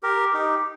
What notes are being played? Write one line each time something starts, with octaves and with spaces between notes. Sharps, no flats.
G4 A#4
D#4 G4